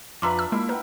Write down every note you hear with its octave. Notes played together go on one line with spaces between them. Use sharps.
F2 D4 F4 B4 E5 A#5 C6 D6
E6
G#3 A#3 E4 E5 B5
A#4 B4 F#5 G5